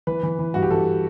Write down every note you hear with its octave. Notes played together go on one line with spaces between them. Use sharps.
E3 B4
E3
E3
G2 F#4
G4
E3 A4